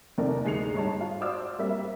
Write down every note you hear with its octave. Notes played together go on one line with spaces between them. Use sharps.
E2 C3 D#3 A4 A#4 D5
D2 G#3 D#4 C7 C#7 F7
G#2 G3 C#5 D#5 A5
F4
F#4 C5 D5 D6 E6 F6
G3 A#3 C4 E5